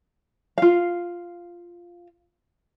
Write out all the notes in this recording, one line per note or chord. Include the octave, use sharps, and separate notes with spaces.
F4 F5